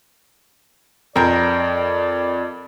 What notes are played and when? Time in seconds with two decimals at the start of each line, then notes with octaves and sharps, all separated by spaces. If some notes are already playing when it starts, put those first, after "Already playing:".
1.16 F2 A#4 D5 G5